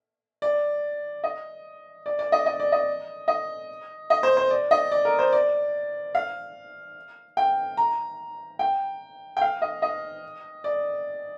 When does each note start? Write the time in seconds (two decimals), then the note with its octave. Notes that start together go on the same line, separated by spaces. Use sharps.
0.42 D5
1.24 D#5
2.06 D5
2.19 D5
2.32 D#5
2.46 D#5
2.60 D5
2.72 D#5
3.28 D#5
4.10 D#5
4.23 C5
4.37 C5
4.51 D5
4.71 D#5
4.92 D5
5.05 A#4
5.19 C5
5.33 D5
6.15 F5
7.37 G5
7.77 A#5
8.59 G5
9.37 G5
9.41 F5
9.62 D#5
9.82 D#5
10.64 D5